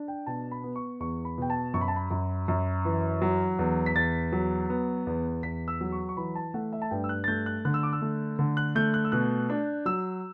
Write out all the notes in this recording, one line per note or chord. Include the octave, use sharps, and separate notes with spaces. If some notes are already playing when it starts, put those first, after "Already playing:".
Already playing: D4
G5
B2 A5
B5
B3
C#6
E2 C#6
B5
B2 G5
A5
F#2 C#6
B5
A5
B5
F#2
F#2
E3
F#3
E2
B6
E2 A6
F#3
B3
E2
E2 B6
E6
F#3
C#6
C#6
E3 B5
A5
A3 F#5
E5
A5
G2 G5
E6
F#6
A6
A3 G6
F#6
D3 F#6
E6
D6
E6
A3
D3
F#6
A3 G6
F#6
E6
B2 F#6
D4
F#3 E6